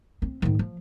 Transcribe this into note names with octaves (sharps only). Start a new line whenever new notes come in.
C4
G#2 D#3
F3